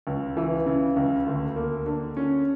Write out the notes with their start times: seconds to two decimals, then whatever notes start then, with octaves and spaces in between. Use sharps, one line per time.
0.07 C#2
0.37 E3
0.66 C#3
0.96 C#2
1.26 D2
1.56 A#3
1.86 D3
2.17 C#4